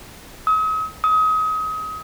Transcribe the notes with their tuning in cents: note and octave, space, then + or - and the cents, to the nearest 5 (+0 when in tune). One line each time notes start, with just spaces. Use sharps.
D#6 +40
D#6 +30